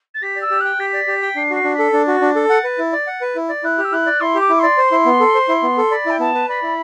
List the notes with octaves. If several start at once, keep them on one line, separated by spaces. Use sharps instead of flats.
A6
G4 B6
D5
E6
G4
G5 F#6
G4 B6
D5
G4
G5
D4 C7
F#4 C7
D4
B6
A4
D4 A6
F#4
D4
A4
F#5
B4
E4
D5
F#5
B4
E4
D5
E4 F#6
G4
E6
E4 F#6
D5
E4 C6
G4 D6
E4
D5 C6
C5
E4
B3
A4
C5
E4
B3
A4
D5 B5
E4 G5
B3 A5
B4
D5 B5
E4